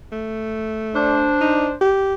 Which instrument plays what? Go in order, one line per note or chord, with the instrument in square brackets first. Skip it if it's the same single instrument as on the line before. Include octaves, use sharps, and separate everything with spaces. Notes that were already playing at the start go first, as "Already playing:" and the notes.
[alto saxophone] A3
[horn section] D4 C5
[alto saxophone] D#4
G4